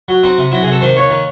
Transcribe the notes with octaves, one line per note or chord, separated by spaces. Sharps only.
F#3
C4 D#4
C3
F#3 E4
C3 G#4
A4
D#3 C5
D#2 C#5
D#3